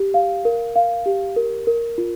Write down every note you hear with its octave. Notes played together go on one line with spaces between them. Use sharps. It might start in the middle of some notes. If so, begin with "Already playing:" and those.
Already playing: G4
F5
A#4
F5
G4
A#4
A#4
F4